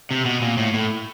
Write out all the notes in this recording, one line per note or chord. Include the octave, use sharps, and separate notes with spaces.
C3
B2
A#2
A2
A2